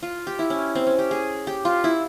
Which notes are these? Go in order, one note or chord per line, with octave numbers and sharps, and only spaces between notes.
F4
G4
E4
C#4
C4
C#4
G4
G#4
G4
F4
E4